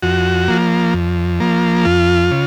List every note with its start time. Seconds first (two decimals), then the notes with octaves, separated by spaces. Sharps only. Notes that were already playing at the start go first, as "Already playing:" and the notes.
0.03 F2 F#4
0.48 F3 A#3
0.94 F2
1.40 F3 A#3
1.85 F2 F4
2.31 C#3